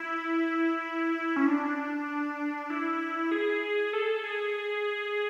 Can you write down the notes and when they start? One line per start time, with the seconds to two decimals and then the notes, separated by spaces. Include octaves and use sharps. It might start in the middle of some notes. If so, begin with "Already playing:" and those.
Already playing: E4
1.36 C#4
1.47 D4
2.70 E4
3.31 G#4
3.93 A4
4.24 G#4